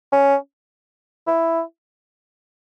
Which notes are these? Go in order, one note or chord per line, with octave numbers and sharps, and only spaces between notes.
C#4
E4